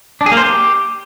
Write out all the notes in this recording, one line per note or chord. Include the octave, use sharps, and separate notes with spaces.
D4
G#4
A#3
C5
G4